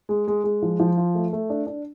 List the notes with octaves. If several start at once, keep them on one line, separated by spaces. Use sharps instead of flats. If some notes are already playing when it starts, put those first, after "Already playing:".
G#3
G#3
G#3
F3
F3
F4
A3
A3
D4
D4